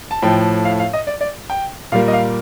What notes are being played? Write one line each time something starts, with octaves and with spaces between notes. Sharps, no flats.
A5
A2 F3 A3 G5
F5
F5
D#5
D5
D5
G5
A#2 G3 A#3 F5
D#5
F5